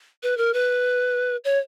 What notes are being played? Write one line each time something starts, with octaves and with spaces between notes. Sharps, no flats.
B4
A#4
B4
C#5